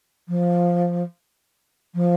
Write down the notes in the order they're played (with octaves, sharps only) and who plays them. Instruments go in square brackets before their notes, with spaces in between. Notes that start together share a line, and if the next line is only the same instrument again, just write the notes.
[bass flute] F3
F3